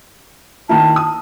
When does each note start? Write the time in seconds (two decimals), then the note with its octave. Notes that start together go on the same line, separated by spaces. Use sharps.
0.69 D#3 A#3 E4 A5
0.96 D#6